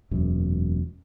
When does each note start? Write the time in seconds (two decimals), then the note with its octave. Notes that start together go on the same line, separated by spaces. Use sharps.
0.11 E1 F#2 A#2